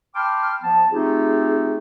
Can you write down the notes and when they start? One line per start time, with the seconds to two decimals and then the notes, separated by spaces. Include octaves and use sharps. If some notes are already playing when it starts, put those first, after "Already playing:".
0.14 G5 A5 B5 C6 D6 F6
0.62 F3 B3 A5
0.91 A3 C4 D#4 F4 G4 G#4